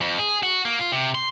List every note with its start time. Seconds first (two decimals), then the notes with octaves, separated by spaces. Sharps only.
0.01 F2
0.19 G#4
0.43 F#4
0.65 A#3
0.79 F4
0.92 C3
1.15 C6